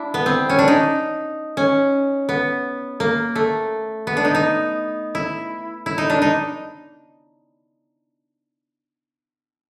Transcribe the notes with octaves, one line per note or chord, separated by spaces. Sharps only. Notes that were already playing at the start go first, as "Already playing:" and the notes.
Already playing: D4 E4
B3
C4
C#4
D4
D#4
C#4
B3
A#3
A3
B3
D4
D#4
D#4
E4
E4
D#4
D4
D#4